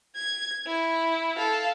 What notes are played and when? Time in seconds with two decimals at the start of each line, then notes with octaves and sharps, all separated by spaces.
0.16 G#6
0.67 E4
1.36 A4 F5